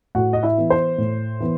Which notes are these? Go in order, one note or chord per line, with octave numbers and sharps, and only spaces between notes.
A2 F#4 F#5
D#5
E4 E5
E3 B3
C5
A2
E3 B3